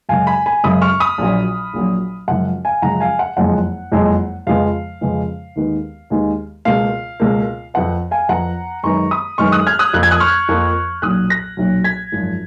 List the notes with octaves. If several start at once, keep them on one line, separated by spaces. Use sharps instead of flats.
F#2 C#3 G#3 F5 G#5
G#5 B5
G#5 B5
F#2 C#3 G#3 B5 D#6
C#6 F6
B5 D#6
A#1 A#2 F#3
A#1 A#2 F#3
F#2 C#3 F3 G#3 F#5
F5 G#5
F#2 C#3 F3 G#3 F#5 A#5
F5 G#5
F#5
F#1 F2 F3 G#3 F#5
F#1 F2 F3 G#3
F2 C#3 F3 G#3 B3 F5
F2 C#3 F3 G#3 B3
D#2 D#3 G#3 B3
D#2 D#3 G#3 B3
C#2 B2 A#3 F5
C#2 B2 A#3
F2 F3 B3 F#5
F5 G#5
F2 F3 B3 F#5 A#5
F#2 D#3 G#3 B3 A#5 C#6
B5 D#6
F#2 D#3 G#3 B3 C#6 F6
D#6 F#6
F6 G#6
D#6 F#6
F2 F3 A#3 F#6
G#6
D#6 F#6
C#6 F6
F2 F3 A#3
B1 A#2 F#3 D#6 F#6
F#6 A#6
B1 A#2 F#3
G#6 B6
G#1 F#2 F3